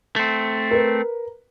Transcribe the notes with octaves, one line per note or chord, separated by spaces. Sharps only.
A3 C4
A#4 B4